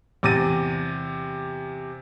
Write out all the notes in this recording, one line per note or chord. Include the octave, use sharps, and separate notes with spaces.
E2 C3 D6 A6 A#6 D#7